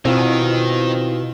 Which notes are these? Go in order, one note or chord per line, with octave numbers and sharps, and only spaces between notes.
B2 D#3 C4 E4 F4